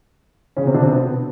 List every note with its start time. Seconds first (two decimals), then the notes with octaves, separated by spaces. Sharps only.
0.57 C#3 C#4
0.66 C3 C4
0.74 D3 D4
0.83 C3 C4
0.91 B2 B3